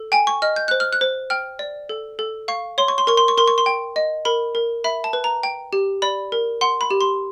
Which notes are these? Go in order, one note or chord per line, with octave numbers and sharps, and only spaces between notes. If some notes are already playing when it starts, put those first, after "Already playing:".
Already playing: A4
G5 G#5
C#6
D#5 F6
G6
C5 F#6
F6
F#6
C5
G5 F6
D5
A4
A4
F5 C#6
C#5 C6
C#6
C6
A#4 C#6
C6
C#6
A#4 C6
C#6
C6
G5
D#5
A#4 B5
A#4
E5 B5
A5
B4
A#5
G5
G4
D5 B5
A#4
F#5 C6
B5
G4
C6